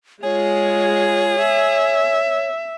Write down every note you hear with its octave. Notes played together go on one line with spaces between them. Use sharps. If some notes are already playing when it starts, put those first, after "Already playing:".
G#3 F4 G#4 C#5
E5